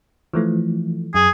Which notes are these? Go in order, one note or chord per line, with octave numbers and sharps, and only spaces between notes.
E3 F3 A3
F#2 G#4